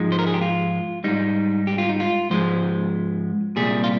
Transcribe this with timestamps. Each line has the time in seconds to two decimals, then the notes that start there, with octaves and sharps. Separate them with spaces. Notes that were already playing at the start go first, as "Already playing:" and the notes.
Already playing: G#2 F3 G#3 D#4
0.12 C5
0.19 A#4
0.27 G#4
0.34 G4
0.41 F4
1.04 G#2 G3 D#4
1.67 G4
1.78 F4
1.89 D#4
2.00 F4
2.30 G#2 F3 G#3 C5
3.56 C2 A#2 G3 G#4
3.84 F4